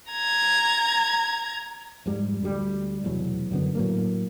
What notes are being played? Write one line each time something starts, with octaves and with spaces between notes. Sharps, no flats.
A#5 G#6
F2 G#2 G3
D2 G3
F1 E2 B2 F#3
F#2 D3 B3
A2 F#3 A#3